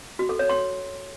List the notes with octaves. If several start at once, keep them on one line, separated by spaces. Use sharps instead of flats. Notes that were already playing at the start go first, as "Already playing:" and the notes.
F#4
A4
C#5
C6